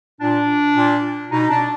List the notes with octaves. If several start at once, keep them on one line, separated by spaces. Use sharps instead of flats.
A#2 D4
A#2
B2 D#4
D4